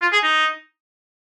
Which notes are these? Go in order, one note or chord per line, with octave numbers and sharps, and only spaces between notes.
F4
G#4
D#4